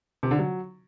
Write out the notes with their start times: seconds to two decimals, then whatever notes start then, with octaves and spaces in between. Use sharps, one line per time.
0.23 C3
0.31 D3
0.39 F#3